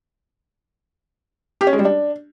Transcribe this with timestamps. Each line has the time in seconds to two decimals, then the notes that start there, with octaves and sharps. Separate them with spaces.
1.61 G4
1.67 C#4
1.73 G#3
1.79 G3
1.85 D4